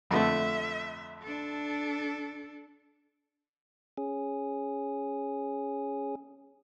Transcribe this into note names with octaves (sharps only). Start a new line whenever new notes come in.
F2 D3 A3 E5
D4 A4
C#4 G#4